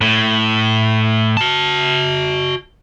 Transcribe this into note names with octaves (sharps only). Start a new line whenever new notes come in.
A2
F#4 A5